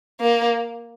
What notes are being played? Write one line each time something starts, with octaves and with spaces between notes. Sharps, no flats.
A#3